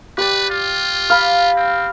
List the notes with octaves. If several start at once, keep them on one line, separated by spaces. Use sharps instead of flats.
G4 B4 D5
F4
F5 B5
C4